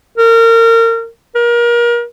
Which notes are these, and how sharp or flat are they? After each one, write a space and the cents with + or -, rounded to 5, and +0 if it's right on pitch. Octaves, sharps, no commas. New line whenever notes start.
A#4 -30
A#4 +30